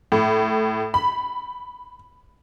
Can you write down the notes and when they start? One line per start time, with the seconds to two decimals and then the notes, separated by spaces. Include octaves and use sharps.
0.12 A2
0.94 B5